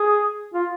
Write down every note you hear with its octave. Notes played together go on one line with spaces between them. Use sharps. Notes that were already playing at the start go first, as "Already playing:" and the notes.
Already playing: G#4
F4